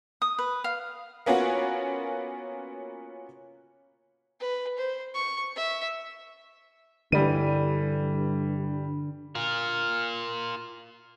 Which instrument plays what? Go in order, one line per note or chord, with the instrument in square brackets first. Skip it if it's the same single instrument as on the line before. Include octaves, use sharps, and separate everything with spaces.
[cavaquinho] D#6
B4
F5
[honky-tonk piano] A#3 B3 C#4 F4 F#4
[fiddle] B4
C5
C#6
E5
[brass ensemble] G2 [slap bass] D3 [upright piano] E3 G3 D#7
[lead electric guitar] F4 A#4